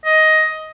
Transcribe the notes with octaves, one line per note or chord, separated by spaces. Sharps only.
D#5